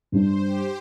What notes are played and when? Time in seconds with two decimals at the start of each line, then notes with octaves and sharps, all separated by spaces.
0.12 G2 G3 D4 C5
0.42 G4